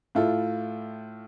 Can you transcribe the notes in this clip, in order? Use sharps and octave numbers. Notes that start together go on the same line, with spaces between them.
A2 E4 F4 A4